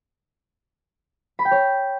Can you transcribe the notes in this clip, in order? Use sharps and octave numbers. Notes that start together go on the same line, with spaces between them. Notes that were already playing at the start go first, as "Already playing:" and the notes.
B5
G5
C#5